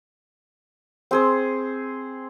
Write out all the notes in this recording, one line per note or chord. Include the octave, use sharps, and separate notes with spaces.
C4 G#4 C5